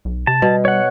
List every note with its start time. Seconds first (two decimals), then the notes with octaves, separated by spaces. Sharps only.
0.05 B1
0.27 C3 A5
0.42 B2 G3
0.65 C#5 F#5